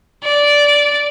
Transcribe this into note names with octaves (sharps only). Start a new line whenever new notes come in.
D5